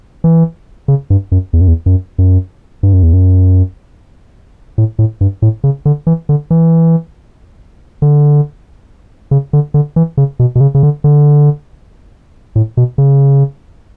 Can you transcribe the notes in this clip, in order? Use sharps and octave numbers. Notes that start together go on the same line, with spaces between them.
E3
C#3
G2
F#2
E2
F#2
E2
F#2
F#2
G2
F#2
E2
F#2
A2
A2
G2
A2
C#3
D3
E3
D3
E3
D3
C#3
D3
D3
E3
C#3
B2
B2
C#3
C#3
D3
D3
A2
B2
C#3